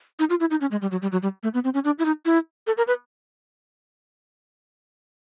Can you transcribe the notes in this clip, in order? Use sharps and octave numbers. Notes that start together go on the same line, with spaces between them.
D#4
F4
E4
D#4
C#4
G#3
G3
F#3
G3
F#3
G3
A3
B3
C4
C#4
D4
E4
D#4
E4
A4
A#4
B4